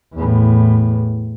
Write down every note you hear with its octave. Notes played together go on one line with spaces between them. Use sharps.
E2 A2